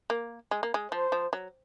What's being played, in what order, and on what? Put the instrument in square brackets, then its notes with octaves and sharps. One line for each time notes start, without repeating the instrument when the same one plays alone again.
[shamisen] A#3
G#3
A#3
G#3
[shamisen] F3 [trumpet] C5
[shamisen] F3
F#3